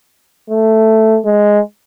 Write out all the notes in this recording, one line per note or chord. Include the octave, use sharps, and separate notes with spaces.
A3
G#3